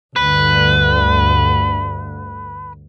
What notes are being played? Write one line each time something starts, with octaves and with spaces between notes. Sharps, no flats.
D2 G2 D3 B4